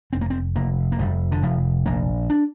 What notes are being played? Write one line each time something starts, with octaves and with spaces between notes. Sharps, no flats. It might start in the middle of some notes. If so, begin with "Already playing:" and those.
F1 C4
A#3
C4
F1 A#3
A#3
F1 G3
D3
F1 F3
A#1 A#3
D4